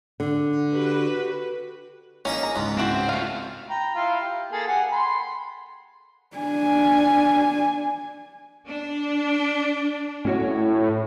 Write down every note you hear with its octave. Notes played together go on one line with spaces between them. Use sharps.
D3
F#4 G4 B4
A#3 C#4 D#4 G#4
A#5
C#2 G#2 B3
B3 C4 E4 F#4
A3 F4 F#4 F5
G5 A#5 B5
E4 F4 F5
G4
A#3 G#4 A4
G4 F#5 G#5
B5 C6
D4 G#5
D4
A2 C#4 F#4 C#5